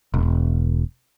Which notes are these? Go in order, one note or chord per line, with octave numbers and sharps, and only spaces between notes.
E1